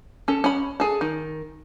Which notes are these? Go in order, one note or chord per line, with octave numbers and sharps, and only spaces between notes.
C#4 A4
C#4 B5
G#4 A4
D#3